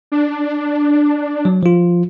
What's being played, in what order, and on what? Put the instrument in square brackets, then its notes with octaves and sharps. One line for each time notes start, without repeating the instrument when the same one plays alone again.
[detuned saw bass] D4
[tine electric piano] F#3
F3 F4